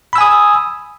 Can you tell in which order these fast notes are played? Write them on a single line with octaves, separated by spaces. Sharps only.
B5 E6 G#5 D#6